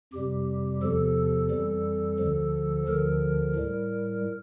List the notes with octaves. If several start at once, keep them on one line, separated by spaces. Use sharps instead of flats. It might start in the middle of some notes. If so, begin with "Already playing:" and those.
F2 C3 G3 G4
E2 C3 F3 A4
F2 E3 G3
D2 D3 F3
D2 D3 F3 A#4
A2 G3